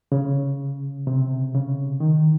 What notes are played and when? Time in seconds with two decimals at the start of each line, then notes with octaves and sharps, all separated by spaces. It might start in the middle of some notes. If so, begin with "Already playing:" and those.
0.12 C#3
1.07 C3
1.54 C#3
2.00 D#3